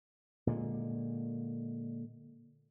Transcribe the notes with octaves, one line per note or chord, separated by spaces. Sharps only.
A#2 D3 G#3